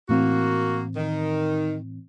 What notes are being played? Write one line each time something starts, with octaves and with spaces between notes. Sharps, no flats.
A2 E3 A#3 C4 F#4
D#3